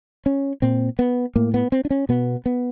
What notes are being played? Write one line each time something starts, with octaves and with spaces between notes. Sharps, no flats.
C#4
A#2 C4
B3
A2 A#3
B3
C4
D4
C#4
B2 B3
B3